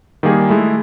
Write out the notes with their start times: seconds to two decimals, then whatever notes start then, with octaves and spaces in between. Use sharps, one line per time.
0.23 D#3 G3 A#3 G#4
0.49 G#3 A3 E4